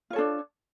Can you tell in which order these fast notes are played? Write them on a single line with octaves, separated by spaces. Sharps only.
F4 C#5 A4 D4